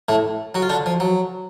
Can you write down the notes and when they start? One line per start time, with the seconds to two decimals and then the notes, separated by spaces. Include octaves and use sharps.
0.09 A2 A3
0.55 F#3 F#4
0.62 F4
0.70 D3 D4
0.86 F3
1.00 F#3